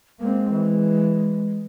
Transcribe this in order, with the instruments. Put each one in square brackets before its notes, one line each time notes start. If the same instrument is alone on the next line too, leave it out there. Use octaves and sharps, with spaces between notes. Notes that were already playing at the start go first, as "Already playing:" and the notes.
[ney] G#3 [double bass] A#3 C4
[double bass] E3